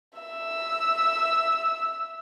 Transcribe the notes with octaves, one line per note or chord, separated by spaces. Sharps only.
E5 E6